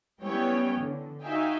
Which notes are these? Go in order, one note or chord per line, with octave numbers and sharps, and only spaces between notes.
G3 B3 C#4 E4 C#5 G5
D3
D#4 F#4 E5 F5 G5 G#5